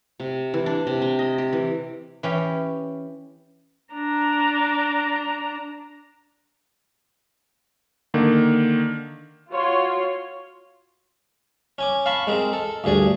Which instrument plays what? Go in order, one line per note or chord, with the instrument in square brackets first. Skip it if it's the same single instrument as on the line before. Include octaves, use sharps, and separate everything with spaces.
[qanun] C3
E3
D4
C3
C4
D#5
G4
E3
[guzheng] E3 C#4 G4
[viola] D4 A#5
[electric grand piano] D3 D#3 A#3
[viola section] F4 F#4 C#5 C6
[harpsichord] C#4 G#5 D6
F5 A5 B5 C#6
G#3 C4 A#4
A4
D2 G2 G#4 D5 G#5